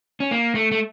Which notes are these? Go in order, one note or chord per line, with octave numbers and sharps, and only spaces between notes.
C#4
A#3
A3
A3